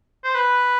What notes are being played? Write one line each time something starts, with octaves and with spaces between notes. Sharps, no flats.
C5
B4